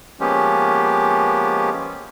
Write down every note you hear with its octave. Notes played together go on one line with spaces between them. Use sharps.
F3 G#3 A#3 B3 C#4 G4